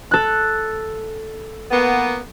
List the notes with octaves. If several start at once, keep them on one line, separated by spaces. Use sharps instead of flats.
A4 F#6
A#3 B3